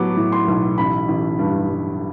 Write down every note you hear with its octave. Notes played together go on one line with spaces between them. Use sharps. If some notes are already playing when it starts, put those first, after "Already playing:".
Already playing: A2 F#3 B3 D6
A2
C6
B1
A1 B5
A1
G2
G2